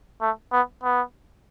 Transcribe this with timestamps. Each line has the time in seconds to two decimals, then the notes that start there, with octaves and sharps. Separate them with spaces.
0.21 A3
0.52 B3
0.83 B3